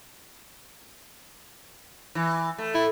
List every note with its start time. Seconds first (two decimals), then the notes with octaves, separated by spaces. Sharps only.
2.15 E3
2.58 A3
2.74 E4